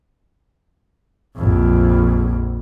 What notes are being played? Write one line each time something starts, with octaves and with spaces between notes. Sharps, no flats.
A#1 F2